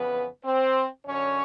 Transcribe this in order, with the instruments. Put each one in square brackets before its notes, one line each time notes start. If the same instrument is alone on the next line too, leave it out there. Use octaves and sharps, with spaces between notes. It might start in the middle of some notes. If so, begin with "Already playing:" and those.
Already playing: [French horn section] F2 C#3 E3 B3 B4
C4 C5
F#2 D3 C#4 C#5